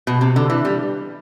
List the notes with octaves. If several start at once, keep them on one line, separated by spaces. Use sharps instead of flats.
B2
C3
D3
E3
G3